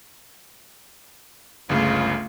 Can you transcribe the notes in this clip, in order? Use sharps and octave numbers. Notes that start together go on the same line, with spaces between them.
G1 C#2 C#3 A3 F4